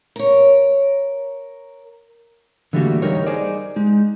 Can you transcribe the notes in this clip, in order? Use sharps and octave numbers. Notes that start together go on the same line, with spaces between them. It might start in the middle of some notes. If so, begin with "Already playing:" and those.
A#4 C#5
D3 E3 G3 A3 A#3 F#4
G3 D#4 A#4 C#5
D#4 G#4 C5 D5
G#3 D#4